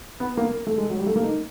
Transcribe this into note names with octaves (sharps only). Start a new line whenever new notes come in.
B3
A#3
A3
G#3
F#3
G3
A3
A#3
D#4